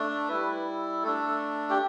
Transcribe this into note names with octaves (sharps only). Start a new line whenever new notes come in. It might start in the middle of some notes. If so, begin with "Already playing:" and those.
Already playing: A3 D4
G3 E4 B4
A3 D4 A4
G4